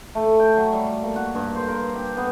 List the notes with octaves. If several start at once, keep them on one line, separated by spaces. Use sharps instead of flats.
A3
G5
F#3
G3
A#3
F#4
G2
C5
A#4
G4
B3